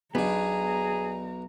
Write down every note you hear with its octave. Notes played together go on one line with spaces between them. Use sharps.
B1 B2 B3 D4 G#4 A#5